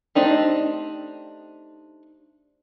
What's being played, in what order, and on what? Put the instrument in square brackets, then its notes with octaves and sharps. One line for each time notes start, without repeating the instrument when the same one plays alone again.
[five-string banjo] A3 C4 D4 D#4 G4